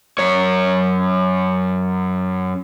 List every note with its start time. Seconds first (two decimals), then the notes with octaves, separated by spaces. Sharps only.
0.19 F#2 C#5